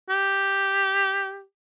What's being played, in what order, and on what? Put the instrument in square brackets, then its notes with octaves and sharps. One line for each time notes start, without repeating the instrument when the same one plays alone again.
[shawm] G4